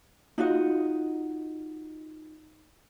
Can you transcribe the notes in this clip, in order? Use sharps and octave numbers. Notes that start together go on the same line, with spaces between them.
D#4 F4 F#4 D#5